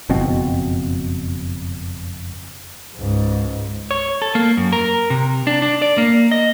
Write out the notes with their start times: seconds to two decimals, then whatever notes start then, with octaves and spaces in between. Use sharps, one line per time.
0.09 F#1 F2 B2 C4
2.96 C#2 G#2
3.91 C#5
4.22 A4
4.35 A#3
4.57 F#2
4.73 A#4
5.10 C3
5.47 D4
5.62 D4
5.82 D5
5.98 A#3
6.31 D#5